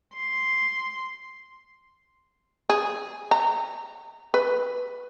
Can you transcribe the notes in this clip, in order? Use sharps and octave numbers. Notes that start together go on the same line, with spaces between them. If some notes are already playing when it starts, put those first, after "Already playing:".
C6
G#4
A#5
B4